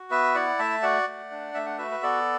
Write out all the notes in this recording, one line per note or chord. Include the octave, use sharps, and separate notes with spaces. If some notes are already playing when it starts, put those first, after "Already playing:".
Already playing: F#4
B3 B4 E5
E4 D5 F#5
A3 E5 A5
F#4 D5 F#5
A3
D4
A3 E5
F#5
F#4 B4 E5
B4
B3 A4 D5